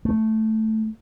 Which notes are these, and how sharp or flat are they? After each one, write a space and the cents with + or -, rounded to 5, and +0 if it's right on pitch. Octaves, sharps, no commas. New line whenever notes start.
A3 +0